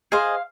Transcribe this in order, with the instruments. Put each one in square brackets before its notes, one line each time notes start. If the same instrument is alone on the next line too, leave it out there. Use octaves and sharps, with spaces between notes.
[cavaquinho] G#4 C5 D#5 F5